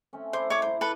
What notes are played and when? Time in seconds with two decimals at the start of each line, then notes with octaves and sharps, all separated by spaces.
0.13 A3 C4 C#4
0.33 E4 C5 D5
0.50 C#5 D6
0.62 A2 C5 A#5
0.81 A4 B4